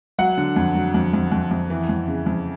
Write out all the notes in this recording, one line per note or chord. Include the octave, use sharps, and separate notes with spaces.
F#3 F#5
D3
F2
F#3
F2
F2
F2
F2
E3
F2
C#3
F2